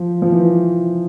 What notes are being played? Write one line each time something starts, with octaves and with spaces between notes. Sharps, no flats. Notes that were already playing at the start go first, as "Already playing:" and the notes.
Already playing: F3
F3
E3